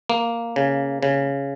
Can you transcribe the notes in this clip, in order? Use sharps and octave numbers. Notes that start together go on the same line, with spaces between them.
A#3
C#3
C#3